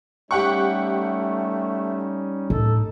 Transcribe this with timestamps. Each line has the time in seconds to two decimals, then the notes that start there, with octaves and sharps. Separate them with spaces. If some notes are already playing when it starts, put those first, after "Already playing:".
0.31 G3 A3 C#4 D#4 G4 F#5 C#6
2.50 A2 D#4 A4